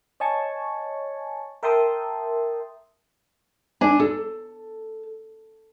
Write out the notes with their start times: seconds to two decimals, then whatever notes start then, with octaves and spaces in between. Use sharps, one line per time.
0.20 C#5 D#5 G#5 A5 C#6
1.63 A#4 E5 G5 A5 C6 D#6
3.81 D4 G#5
4.00 A4